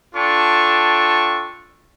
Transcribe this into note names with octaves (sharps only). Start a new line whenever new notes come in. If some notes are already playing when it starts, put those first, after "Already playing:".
D4 F4 A4 G5 C#6